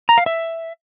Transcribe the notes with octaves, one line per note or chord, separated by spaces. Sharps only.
A#5
F5
E5